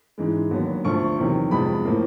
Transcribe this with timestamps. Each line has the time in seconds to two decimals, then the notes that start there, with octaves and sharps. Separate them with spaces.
0.18 G#2 E3 G#3
0.51 D#2 D3 F#3 B3
0.85 D2 D3 F3 C#6
1.18 E2 C3 D#3 F#3
1.51 F2 C3 F3 G#3 B3 B5
1.85 A2 F3 A#3